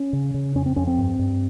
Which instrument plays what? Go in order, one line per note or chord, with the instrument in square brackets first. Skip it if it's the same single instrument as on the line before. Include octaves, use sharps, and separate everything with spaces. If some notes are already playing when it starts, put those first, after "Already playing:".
Already playing: [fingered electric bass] C#4
C#3
C#3
F2 C#4
C4
F2 C#4
C4
G2
G2